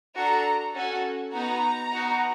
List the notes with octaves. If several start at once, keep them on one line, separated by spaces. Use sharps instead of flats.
D4 F#4 A4 A#5
C#4 F#4 A4
B3 D#4 F#4 A#5
B3 D#4 F#4